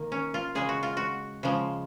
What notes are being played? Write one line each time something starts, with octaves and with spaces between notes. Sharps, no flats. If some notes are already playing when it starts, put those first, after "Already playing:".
Already playing: D#3 A#3
C#4
F4
C#3 G#3 G#4
F#4
F4
F#4
C#3 F3 G#3